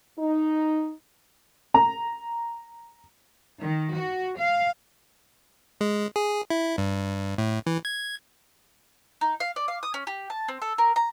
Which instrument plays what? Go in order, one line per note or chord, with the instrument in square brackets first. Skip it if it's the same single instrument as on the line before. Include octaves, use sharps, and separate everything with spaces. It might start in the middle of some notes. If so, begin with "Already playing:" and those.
[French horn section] D#4
[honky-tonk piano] A#5
[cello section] D#3
F#4
F5
[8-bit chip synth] G#3
G#4
E4
G2
A2
E3
G#6
[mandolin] D#4
F5
D5
F5
D#6
C#4
G4
A5
C4
A4
A#4
A#5